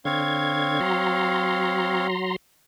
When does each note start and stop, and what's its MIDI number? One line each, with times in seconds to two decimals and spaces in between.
0.05 0.80 50
0.05 2.07 60
0.05 2.07 73
0.05 2.07 77
0.05 0.80 92
0.81 2.36 54
0.81 2.36 82
0.81 2.36 84